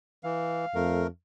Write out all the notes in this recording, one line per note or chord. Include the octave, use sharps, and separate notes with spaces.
E3 F5
F2 A3 A#4